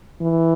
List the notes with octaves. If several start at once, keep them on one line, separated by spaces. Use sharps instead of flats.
E3